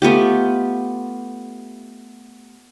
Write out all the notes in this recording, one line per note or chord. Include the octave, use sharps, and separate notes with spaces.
A3 B3 F4 G4